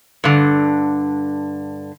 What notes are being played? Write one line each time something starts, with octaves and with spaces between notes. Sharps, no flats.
G2 D3